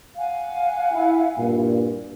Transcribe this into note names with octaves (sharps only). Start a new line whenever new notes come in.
F5 F#5 G#5
E4
G2 A#2